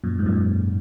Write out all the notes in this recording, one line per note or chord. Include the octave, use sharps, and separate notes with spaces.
F#2 A#2
G#2
F#2 A#2